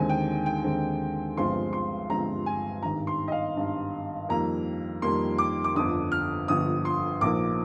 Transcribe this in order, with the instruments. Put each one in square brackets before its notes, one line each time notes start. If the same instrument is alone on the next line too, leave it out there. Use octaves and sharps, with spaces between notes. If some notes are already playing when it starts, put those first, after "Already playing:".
Already playing: [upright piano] D#2 D3 G#3 C4 G#5
G5
G5
D#2 D3 G#3 C4
G1 G2 F3 G#3 C4 C6
C6
G1 G2 F3 G#3 C4 A#5
G#5
G#1 G2 D#3 A#5
C6
D#5
F5
G#1 G2 D#3
F2 D#3 G3 A#3 A#5
F2 D#3 G3 A#3 C6
D6
D6
G1 F2 D3 D#6
F6
G1 F2 D3 D#6
C6
A#1 G#2 F3 A#3 D6